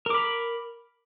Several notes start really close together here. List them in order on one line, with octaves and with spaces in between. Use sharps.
A#4 D6 B5